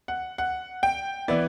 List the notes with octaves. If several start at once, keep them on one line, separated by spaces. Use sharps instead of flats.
F#5
F#5
G5
E3 B3 E4 D5